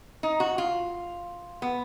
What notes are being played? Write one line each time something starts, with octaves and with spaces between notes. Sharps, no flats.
D#4
F#4
F4
B3